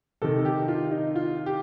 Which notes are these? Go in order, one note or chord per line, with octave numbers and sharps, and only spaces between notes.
C3 D#3 A4
G4
F4
D#4
F4
G4